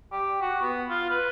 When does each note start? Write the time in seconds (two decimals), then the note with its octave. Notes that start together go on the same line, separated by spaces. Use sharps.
0.12 G4
0.41 F#4
0.62 B3
0.89 F4
1.10 B4